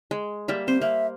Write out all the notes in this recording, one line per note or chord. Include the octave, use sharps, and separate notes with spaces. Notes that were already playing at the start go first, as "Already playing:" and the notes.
G#3
G3 A#3 E5
C4 C5
A#3 E5